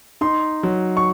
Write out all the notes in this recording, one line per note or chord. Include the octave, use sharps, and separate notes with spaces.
D#4 C6
F#3
C#6